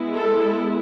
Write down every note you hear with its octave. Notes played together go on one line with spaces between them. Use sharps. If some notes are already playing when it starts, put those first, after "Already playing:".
Already playing: G#3 B3 E4
A4